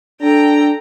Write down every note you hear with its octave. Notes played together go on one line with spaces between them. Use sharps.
D4 A4 G5 A#5